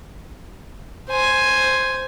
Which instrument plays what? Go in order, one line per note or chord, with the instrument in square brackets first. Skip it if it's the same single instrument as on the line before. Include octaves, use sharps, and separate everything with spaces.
[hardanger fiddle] C5 G#5